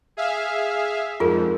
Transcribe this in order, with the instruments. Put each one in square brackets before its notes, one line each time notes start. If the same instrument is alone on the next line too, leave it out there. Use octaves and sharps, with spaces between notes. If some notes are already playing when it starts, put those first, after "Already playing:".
[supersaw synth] G#4 E5 F5
[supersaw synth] F2 G#2 [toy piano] F4 G#4 A#4